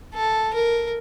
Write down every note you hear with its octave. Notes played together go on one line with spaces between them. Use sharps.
A4
A#4